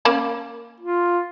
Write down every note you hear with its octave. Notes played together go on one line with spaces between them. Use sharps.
A#3 C#4 B5
F4